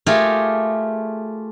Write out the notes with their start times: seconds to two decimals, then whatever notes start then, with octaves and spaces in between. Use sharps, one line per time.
0.06 A3 F4 G4 G#4 A#4